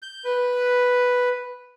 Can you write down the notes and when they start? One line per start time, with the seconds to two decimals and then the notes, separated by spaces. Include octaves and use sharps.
0.02 G6
0.25 B4